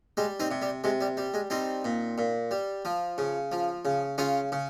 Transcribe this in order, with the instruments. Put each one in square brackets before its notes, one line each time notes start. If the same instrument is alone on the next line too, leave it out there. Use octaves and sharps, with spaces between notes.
[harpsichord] G3 G#3
C4 D#4
C3
G3
C3 G#3
G3
G3
G#3
G3 C4 D#4
A#2
A#2
G3
F3
C#3
F3
C#3
C#3 C#4 F4
C#3